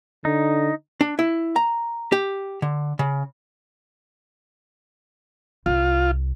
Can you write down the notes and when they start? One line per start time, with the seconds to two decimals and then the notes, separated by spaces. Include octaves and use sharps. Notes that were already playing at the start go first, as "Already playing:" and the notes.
0.25 D3 D#4
1.01 D4
1.19 E4
1.56 A#5
2.12 G4
2.62 D3
2.99 C#3
5.66 C2 F4